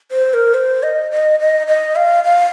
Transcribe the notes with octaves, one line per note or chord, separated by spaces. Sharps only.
C5
A#4
C5
D#5
D#5
D#5
D#5
F5
F5